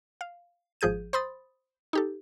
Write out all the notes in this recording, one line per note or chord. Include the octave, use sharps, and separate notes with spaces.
F5
G#1 F3 G#4 G6 D#7
C5 B5 C6 D#6 A6
D#4 G4 A4